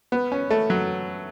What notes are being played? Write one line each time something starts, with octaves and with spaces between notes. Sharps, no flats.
B3
C#4
A3
F#3